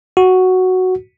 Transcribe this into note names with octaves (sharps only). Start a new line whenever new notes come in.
F#4